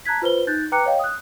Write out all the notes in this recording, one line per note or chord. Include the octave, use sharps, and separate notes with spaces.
A5 A#5 F#6 G#6 B6
F4 B4 C5 G7
D#4 F#6 G6 A6
B4 G5 A#5 D6 F#6 C#7
C#5 D#5 F5 G5
D#6 F#6